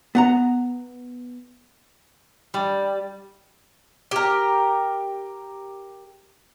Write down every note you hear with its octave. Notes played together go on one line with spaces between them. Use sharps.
B3 F#5 A#5
G3
G4 A#4